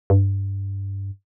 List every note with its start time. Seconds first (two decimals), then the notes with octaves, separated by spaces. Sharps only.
0.10 G2